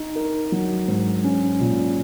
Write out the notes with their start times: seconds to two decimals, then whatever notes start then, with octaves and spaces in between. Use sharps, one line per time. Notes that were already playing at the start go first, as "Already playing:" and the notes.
Already playing: D#4
0.16 A#4
0.52 F#3
0.88 G#2
1.24 C#4
1.60 A#2